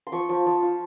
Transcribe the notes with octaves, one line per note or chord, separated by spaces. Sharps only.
C6
F3 C#6
F3
F3
F4